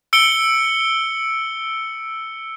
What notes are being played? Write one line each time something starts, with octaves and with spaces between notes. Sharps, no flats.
E6 C#7 D7 G7